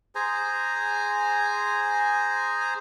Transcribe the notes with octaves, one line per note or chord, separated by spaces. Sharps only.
G#4 C5 G#5 A#5